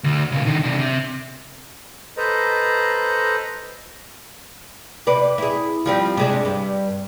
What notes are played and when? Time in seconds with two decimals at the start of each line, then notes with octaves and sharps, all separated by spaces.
0.04 D2
0.31 A#2 C#3
0.45 D3 D#3
0.63 C3 D4
0.79 C3
2.17 A4 B4 C5 D#5 A#5
5.07 C3 B4 D5
5.38 E4 G#4
5.86 F3 G3 C4
6.17 C3 G#3 D4
6.45 G2